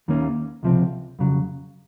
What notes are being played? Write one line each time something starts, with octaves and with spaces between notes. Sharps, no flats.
D#2 D#3 A#3 C#4
C#2 C3 F3 C4
F2 C#3 F#3